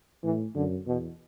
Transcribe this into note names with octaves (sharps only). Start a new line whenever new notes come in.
A2 E3
F#2 D3
E2 B2